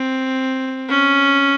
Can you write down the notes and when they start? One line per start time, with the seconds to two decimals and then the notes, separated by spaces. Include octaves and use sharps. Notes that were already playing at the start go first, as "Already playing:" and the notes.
Already playing: C4
0.89 C#4